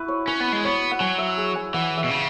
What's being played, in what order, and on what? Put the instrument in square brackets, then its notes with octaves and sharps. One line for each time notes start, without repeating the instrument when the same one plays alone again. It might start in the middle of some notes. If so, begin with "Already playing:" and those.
Already playing: [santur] E4 F#4 B4
C#5
[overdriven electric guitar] C#4 [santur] B4
[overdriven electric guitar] B3
G#3
[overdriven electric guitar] B3 [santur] C#5
[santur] F#5
[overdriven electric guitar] F#3 [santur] G#5
[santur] E5
G#4
G#5
[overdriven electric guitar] E3 [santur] F#5
[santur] E5
[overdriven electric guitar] B2
C#3